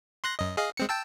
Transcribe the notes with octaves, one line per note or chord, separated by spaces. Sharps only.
C6 F#6 A#6
F#2 D#5
G#4 D#5 F5
G#3 C4 C#7
G5 A5 E6